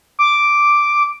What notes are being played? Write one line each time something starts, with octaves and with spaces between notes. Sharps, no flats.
D6